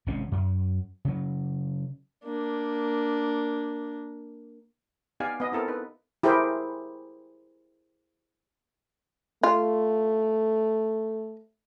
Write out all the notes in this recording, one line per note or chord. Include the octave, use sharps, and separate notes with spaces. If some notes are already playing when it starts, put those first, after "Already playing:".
G#1 G#2 C3 C#4
F#2
C#3 F#3
A#3 D4
B3 D#4 G4 D5 F5 G#5
B3 D#5
C4 E4 A4 A#4
D#4 B4
E4 G4 G#4 A#4 C5
A3 F4